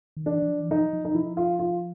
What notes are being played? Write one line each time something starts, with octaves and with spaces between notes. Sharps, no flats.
D#3
E3 D4
E3
F3
E3
F3 D#4
F3
D#4
F3 E4
F4
F4